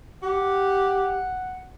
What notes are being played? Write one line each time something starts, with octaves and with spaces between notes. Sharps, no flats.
G4 F#5